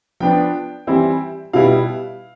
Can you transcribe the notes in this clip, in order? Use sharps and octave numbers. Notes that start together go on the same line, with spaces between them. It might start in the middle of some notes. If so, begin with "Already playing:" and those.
F3 B3 D4 G5
E3 G3 C4 E4
B2 G3 B3 E4 F5